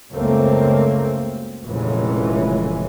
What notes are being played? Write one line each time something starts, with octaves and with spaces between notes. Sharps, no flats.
C#2 F#2 C#3 A3 A#3 C4
F1 A#2 C#3 E3 G#3 C#4